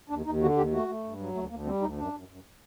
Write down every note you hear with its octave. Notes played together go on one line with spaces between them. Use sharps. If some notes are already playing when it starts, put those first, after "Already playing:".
D#2 D4
D#2 D#4
D3 F#4
D#2 G4
A3 F#4
A3
G2
F#3
D2 A3
D2 A#3
G3 C4
D2 D#4
F#2 D4
F#2
F#2